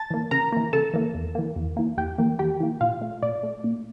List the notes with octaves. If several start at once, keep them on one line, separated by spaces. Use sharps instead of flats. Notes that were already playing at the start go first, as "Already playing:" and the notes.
Already playing: A5 A6
E3 A#3
C#3 A#4 A#5
E3 A#3
C#3 A4 A5
E3 A#3
E2
E3 A#3
E2
E3 A#3
E2 G4 G5
E3 A#3
E2 G4 G5
E3 A#3
A#2 F4 F5
A3
A#2 D5
A3
A#2